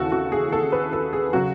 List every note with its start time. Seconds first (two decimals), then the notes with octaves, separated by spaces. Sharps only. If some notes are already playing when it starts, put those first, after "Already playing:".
Already playing: D#2 C#3 E3 F#4 A4
0.12 F#4
0.32 G#4
0.52 A4
0.72 B4
0.93 A4
1.13 G#4
1.33 C#3 F#3 F#4